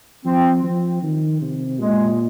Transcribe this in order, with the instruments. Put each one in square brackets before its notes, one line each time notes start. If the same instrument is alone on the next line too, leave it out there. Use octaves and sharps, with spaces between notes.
[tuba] F3 [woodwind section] C4
[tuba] F3
D#3
C3
[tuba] A#2 [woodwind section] G#3